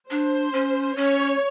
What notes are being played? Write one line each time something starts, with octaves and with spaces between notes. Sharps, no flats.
D4 C5
C#4
C#4 C#5